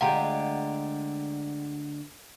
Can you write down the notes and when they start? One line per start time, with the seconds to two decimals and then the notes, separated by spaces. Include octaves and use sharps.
0.01 D2 D3 G#3 F4 G4 F#5 G5 A#5